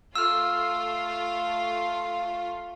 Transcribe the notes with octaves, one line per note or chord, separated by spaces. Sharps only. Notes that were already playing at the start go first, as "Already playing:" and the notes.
A3 F4 F5 E6 F6